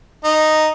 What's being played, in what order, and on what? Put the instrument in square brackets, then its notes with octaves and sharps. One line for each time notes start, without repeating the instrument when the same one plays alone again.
[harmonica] D#4